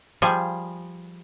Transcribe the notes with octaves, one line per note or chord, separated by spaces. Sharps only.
F3 G3 G#4